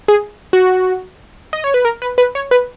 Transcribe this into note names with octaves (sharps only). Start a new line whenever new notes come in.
G#4
F#4
D#5
C#5
B4
A#4
B4
B4
C#5
B4